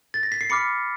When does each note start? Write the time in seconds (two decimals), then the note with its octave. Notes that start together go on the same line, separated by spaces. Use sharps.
0.14 A6
0.23 A#6
0.32 B6
0.41 C7
0.49 B5 D6 F6 B6 C#7